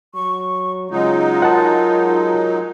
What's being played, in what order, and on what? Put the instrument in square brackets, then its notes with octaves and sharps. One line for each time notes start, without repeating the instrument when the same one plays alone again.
[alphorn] F#3 [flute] C#6
[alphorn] C#3 [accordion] F#3 G#3 D#4 [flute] F4
[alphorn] A#4 [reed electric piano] F#5 A5